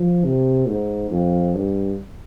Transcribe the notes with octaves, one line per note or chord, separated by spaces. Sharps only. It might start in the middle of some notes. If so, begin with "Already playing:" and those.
Already playing: F3
C3
G#2
F2
G2